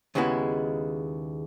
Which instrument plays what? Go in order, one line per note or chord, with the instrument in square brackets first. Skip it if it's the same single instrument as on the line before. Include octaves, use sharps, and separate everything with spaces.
[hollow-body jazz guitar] D#2 C#3 G#3 B3 E4